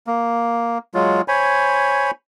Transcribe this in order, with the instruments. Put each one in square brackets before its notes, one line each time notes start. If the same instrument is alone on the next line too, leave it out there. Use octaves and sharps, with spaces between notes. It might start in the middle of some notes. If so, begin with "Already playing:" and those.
[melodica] A#3
F#3 G#3 F4
C5 C#5 G#5 B5